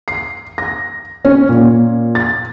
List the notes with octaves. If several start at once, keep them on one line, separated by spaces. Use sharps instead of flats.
C7
A#6
C#4
A#2
A6